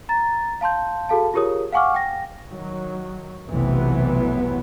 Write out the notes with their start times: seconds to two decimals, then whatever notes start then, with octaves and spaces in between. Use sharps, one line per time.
0.09 A#5 A6
0.61 F5 A5 C6 G6
1.09 F#4 G#4 A4 F5 A5
1.34 F4 G4 G#4 A#4 C#5 D#6
1.73 F5 F#5 G#5 C#6 D6 F6
1.95 G5 A#6
2.49 D#3 F#3
3.49 F1 B1 C3 E3 F#3 B3